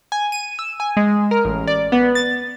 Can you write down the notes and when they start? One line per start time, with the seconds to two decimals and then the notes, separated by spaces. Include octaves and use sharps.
0.12 G#5
0.32 D#7
0.59 E6
0.80 G#5
0.97 G#3
1.31 A#4
1.45 A1
1.67 D5
1.92 B3
2.15 A6